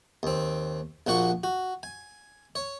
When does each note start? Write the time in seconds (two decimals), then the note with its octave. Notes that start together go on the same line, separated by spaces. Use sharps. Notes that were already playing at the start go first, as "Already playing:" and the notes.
0.23 D#2 C4
1.07 A#1 A#2 F#4 F#5 C#6
1.44 F#4
1.83 G#5
2.55 C#5